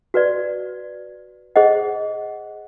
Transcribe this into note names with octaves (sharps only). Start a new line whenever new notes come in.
F#4 B4 D5
G#4 C5 D#5 F#5